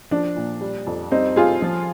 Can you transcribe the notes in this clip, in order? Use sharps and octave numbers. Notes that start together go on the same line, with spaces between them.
F3 D4
A#2
G3
F2
G3 C4 D#4
G3 F4 G#4
F3